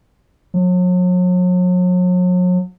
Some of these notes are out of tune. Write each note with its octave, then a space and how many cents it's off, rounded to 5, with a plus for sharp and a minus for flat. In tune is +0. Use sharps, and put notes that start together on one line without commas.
F#3 -40